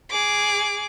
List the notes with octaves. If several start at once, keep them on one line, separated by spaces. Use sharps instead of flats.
G#4 D6